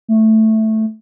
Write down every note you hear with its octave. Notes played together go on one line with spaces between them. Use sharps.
A3